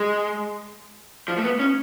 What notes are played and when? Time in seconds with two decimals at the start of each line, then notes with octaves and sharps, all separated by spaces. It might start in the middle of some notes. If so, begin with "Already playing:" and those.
Already playing: G#3
1.28 F3
1.38 A3
1.43 B3
1.59 C#4